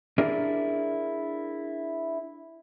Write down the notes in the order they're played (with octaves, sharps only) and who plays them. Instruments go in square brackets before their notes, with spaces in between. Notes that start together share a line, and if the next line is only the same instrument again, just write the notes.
[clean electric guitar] D4 E4 G#4 A#4 D5